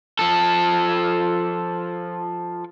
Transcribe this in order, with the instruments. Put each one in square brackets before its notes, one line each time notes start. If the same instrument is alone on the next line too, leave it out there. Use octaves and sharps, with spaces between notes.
[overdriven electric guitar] F3 A4